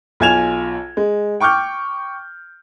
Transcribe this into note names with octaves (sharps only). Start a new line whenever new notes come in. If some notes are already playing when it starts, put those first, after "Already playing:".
B1 F4 G#5 G#6 E7 F7
G#3
G5 C#6 D6 F6 G6